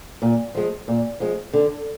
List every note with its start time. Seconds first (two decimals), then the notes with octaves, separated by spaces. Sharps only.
0.22 A#2
0.55 F3 G#3
0.88 A#2
1.20 F3 G#3
1.53 D3